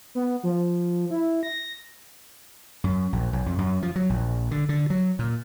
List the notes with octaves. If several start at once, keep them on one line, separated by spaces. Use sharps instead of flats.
B3
F3
E4
A#6
F#2
A#1
B1
F2
F#2
F3
F#3
A#1
D3
D3
F#3
A#2